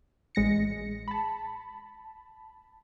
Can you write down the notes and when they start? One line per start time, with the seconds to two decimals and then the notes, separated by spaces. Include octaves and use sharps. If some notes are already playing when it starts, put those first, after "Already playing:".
0.35 A1 G#3 A#6 C#7
1.08 A5 B5